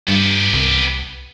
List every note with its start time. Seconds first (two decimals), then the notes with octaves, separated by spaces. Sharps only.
0.08 G2 B3 G4
0.53 C2